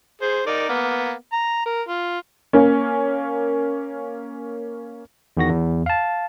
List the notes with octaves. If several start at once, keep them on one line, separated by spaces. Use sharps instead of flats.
G#4 C5
D#4 A#4 D5
A#3 B3
A#5
A#4
F4
A#3 C#4
E2 D#3 F#4 A#6
E2
F5 A5